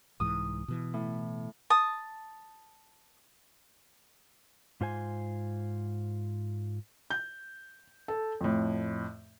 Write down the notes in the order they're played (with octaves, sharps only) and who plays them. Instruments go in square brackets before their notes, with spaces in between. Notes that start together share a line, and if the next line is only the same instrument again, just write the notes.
[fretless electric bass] C2 G#2 E3 [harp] D#6
[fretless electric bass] B2 E3
[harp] A2
[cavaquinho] A5 D#6
[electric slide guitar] G#2 F4 C5 G#5
[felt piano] G6
A4
F2 A2